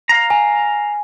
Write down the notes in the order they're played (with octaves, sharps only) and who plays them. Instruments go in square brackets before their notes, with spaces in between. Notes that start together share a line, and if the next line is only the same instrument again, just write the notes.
[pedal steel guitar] F5 A#5
[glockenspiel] G#5